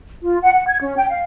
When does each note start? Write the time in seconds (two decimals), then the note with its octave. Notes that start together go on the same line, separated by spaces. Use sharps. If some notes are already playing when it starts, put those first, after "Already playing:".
0.23 F4
0.42 F#5
0.54 F#5
0.68 G#6
0.81 C#4
0.98 G5
1.10 F5